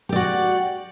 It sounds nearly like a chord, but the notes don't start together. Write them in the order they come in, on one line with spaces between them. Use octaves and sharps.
G4 D5 F#4